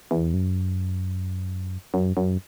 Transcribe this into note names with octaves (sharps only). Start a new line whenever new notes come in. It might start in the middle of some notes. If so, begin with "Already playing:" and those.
E2
F#2
F#2
F#2